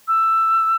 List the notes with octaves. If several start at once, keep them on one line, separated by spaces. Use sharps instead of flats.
E6